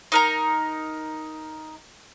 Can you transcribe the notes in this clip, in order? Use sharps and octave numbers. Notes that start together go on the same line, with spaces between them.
D#4 A#4 A#5